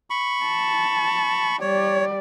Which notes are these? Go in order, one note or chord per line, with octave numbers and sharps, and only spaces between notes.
B5 C#6
A5
G3 C#5 D5